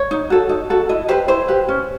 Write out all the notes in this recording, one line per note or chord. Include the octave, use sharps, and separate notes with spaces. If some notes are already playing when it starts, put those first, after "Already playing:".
Already playing: C#5
D#4
F#4 A4
D#4
F#4 A4
E4 D#5
G4 B4 C5
E4 C5
G4 B4
C#4